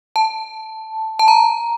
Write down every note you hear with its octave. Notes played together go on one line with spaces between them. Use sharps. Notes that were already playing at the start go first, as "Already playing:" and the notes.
A5
A5
A#5